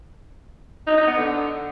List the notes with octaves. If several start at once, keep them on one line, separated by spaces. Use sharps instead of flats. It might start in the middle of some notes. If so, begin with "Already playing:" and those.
D#4
D#4
B3
D3